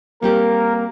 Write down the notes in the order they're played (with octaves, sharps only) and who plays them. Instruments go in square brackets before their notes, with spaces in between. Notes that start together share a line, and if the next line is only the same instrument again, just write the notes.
[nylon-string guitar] G3 C4 G4 [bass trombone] A#3 [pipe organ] A#4